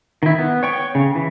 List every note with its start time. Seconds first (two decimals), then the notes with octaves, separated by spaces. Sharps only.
0.23 D#3 E4
0.39 B3
0.63 C#5 G5 C#6
0.95 C#3
1.15 E3